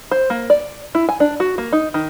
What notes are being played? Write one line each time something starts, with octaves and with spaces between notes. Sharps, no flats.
C5
A#3
D5
E4
G#5
D4
F#4
A#3
D#4
D#3